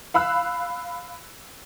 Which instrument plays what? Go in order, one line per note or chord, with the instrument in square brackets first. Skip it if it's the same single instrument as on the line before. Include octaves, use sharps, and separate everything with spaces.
[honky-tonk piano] F5 B5 E6 F#6